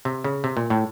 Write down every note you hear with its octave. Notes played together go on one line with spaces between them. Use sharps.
C3
C#3
C3
A#2
A2